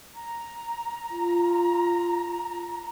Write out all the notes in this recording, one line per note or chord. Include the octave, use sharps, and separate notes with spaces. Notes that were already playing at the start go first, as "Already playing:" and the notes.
A#5
F4